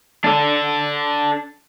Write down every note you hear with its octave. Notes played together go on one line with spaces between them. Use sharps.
D4 A4